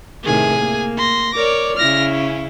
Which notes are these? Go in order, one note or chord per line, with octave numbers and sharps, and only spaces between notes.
A2 C3 D#3 G#4 G#5
A#3
C6 A#6
A#4 C#5 D5 D6
C#3 E4 F6 A#6
C#4